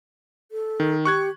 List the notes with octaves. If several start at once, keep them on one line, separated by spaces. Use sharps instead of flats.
A4
D#3
G4 C#6 F#6 G#6